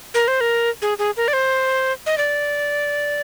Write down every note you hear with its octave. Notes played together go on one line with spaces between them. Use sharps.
A#4
C5
A#4
G#4
G#4
A#4
D5
C5
D#5
D5